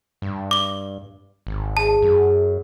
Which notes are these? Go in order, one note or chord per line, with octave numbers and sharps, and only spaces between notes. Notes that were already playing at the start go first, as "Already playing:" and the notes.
G2
D6 G7
G#1
G#4 A5
F#2